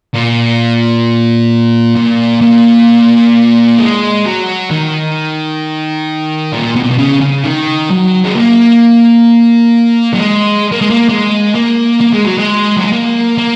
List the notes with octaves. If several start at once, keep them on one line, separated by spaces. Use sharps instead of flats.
A#2
A#2
A#2
G#3
F#3
D#3
A#2
B2
A#2
B2
C#3
C#3
D#3
F#3
G#3
A#3
F#3
G#3
A#3
G#3
A#3
G#3
A#3
A#3
G#3
F#3
G#3
F#3
G#3
A#3
A#3